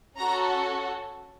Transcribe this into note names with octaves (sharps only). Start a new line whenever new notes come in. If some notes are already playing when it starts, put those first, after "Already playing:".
C#4 F#4 A4 A#5